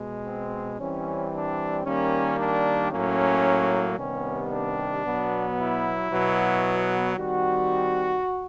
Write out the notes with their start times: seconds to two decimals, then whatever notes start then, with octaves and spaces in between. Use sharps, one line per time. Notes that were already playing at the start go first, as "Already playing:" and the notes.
Already playing: B2 G#3
0.25 C4
0.78 E3 G3 C4 C#4
1.32 D4
1.85 D#3 G3 A#3 C#4
2.39 D4
2.92 A2 F#3 A#3 C#4
3.98 C3 D#3 G3 B3 C#4
4.51 D4
5.04 B2 F#3 B3
5.58 E4
6.11 B2 F#3 B3
7.17 D#3 G3 C4 F#4